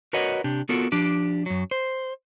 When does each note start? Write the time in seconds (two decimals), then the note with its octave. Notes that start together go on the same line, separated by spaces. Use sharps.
0.13 F#4 A#4 B4 C#5 D#5 F#5
0.44 C3 D4 G4
0.69 B3 F4 F#4 A4 A#4
0.92 F3 D4 G4
1.46 F#2 F#3
1.71 C5